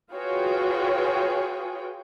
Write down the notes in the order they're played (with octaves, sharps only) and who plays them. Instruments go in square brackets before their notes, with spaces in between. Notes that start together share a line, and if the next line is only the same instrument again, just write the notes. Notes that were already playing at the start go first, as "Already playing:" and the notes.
[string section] F4 F#4 G#4 B4 C#5 G5